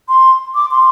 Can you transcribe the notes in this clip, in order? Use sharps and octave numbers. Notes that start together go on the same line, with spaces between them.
C6
D6
C6